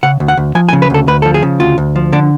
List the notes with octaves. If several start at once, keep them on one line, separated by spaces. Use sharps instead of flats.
C#3 F#5
D2
F#5
D2
F3 G#5
G#5
C#3
B4
D2 A4
D2 B4
F3 A4
G#4
C#3
D2 F4
D2
F3
D3 D4